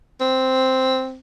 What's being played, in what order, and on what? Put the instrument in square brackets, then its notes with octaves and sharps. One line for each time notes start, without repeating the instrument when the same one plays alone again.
[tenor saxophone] C4